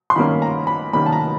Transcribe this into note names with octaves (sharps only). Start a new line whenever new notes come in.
C6
D#3 G3 A#3 C#4 B5
A#5
B5
D#3 G3 A#3 C#4 B5
A5
A#5